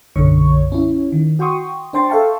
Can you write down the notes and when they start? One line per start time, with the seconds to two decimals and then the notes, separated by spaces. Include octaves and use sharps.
0.16 B1 F#2 D3 C#5 C#6
0.72 C#4 E4
1.12 D#3
1.39 F#4 G5 C6 C#6 D#6
1.93 D4 C5 G5 C6 A6
2.09 A4 E5 F5 G5 A5 C#6